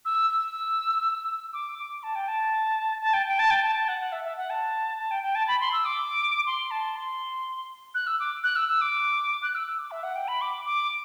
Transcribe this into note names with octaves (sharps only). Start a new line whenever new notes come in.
E6
E6
D6
D6
A5
G5
A5
A5
G5
G5
A5
G5
A5
A5
F#5
F#5
E5
E5
F#5
A5
A5
G5
G5
A5
B5
C6
E6
D6
C6
A5
C6
F#6
E6
D6
F#6
E6
E6
D6
F#6
E6
E6
D6
E5
F#5
G5
B5
D6
D6